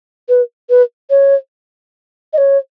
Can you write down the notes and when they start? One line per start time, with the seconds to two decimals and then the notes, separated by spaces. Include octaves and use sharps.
0.29 B4
0.70 B4
1.10 C#5
2.33 D#5
2.38 C#5